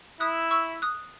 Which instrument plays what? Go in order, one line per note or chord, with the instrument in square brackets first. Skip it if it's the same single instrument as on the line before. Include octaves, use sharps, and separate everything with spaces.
[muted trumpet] E4 [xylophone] D#6 F#6
[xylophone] C#6 E6
D#6 F#6